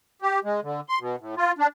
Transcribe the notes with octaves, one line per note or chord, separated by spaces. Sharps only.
G4
G#3
D3
C6
B2
A2
F4
D4